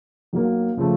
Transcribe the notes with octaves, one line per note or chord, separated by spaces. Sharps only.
B1 B2 F#3 A#3
C#3 F3 A3